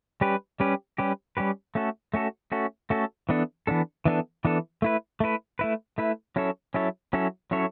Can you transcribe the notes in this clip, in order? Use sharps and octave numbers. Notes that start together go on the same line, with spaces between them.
G3 C#4 G4 B4
G3 C#4 G4 B4
G3 C#4 G4 B4
G3 C#4 G4 B4
A3 C#4 F#4 A4
A3 C#4 F#4 A4
A3 C#4 F#4 A4
A3 C#4 F#4 A4
E3 B3 D4 A4
E3 B3 D4 A4
E3 B3 D4 A4
E3 B3 D4 A4
A3 E4 B4
A3 E4 B4
A3 E4 B4
A3 E4 B4
F#3 C#4 E4 A4 C#5
F#3 C#4 E4 A4 C#5
F#3 C#4 E4 A4 C#5
F#3 C#4 E4 A4 C#5